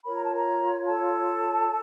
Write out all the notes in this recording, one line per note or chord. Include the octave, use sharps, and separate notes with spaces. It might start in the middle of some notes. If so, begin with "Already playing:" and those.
F4 A#4 C#5 B5
A#5
A5
A#4 A#5
A4 A5